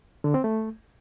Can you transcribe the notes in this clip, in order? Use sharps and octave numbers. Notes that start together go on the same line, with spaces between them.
D3
C4
A3